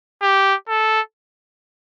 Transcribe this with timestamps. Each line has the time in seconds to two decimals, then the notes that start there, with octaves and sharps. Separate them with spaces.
0.22 G4
0.69 A4